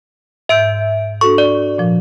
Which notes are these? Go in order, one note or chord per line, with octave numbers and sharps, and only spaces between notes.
G#2 E5 E6 G6 D7
D4 F#4 A4 C#6
D5
A#2 F3